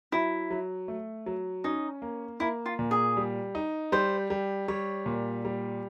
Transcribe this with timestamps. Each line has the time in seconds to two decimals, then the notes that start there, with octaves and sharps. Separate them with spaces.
0.12 F#3 E4
0.50 F#3
0.88 A3
1.26 F#3
1.64 C#4 D#4
2.02 A#3
2.40 A#3 E4
2.66 F4
2.79 A#2
2.91 G#4
3.17 G3
3.55 D#4
3.92 G3 C5
4.30 G3
4.68 G3 C#5
5.06 A#2
5.45 G3